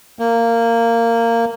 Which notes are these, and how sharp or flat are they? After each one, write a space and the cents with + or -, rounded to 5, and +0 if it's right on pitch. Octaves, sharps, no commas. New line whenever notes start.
A#3 -15